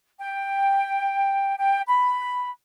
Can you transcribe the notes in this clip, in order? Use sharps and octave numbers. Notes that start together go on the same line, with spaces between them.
G5
G5
B5